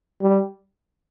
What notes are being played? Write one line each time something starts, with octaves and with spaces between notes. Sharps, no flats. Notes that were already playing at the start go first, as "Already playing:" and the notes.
G3